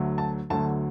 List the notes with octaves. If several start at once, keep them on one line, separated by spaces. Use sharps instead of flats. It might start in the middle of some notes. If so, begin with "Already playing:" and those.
Already playing: D2 D3 F#3 A3
A5
D2 D3 F#3 A3 A5